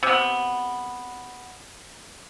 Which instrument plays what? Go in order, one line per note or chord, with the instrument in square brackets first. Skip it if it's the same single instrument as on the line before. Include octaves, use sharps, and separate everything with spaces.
[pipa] C3 B3